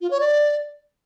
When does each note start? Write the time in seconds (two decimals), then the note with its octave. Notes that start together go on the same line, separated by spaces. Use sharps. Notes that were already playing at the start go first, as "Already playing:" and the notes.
0.01 F4
0.11 C#5
0.20 D5